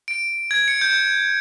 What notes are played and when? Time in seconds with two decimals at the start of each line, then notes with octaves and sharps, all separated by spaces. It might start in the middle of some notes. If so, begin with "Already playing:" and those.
0.08 D7
0.51 G#6
0.68 C#7
0.81 G6